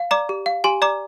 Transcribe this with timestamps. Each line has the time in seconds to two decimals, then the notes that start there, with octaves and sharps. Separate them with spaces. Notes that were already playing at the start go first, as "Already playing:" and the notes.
Already playing: F5
0.11 D5 A#5 D6
0.29 G4
0.46 F5
0.64 G4 G#5 C6
0.82 D5 A#5 D6